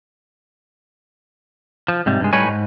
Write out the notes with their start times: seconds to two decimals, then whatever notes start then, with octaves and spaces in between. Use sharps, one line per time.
1.88 F3
2.06 G#2 C3 G3
2.21 G2 G#3
2.33 A2 G3 D#4 B4 C#5 G#5
2.48 G#2